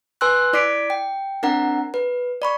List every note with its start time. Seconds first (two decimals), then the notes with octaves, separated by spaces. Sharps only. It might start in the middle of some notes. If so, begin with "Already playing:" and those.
0.21 B4 G#5 C6 E6 F#6
0.53 E4 D5 D6 B6 C7 D7
0.90 G5
1.43 C4 D4 A#4 F#5 A#5
1.94 B4
2.42 D5 B5 C#6